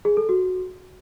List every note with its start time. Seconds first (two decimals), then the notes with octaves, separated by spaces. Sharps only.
0.05 G#4
0.17 A4
0.29 F#4